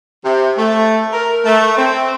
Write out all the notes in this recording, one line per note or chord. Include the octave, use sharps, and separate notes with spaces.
C3
A3
A#4
A3
C4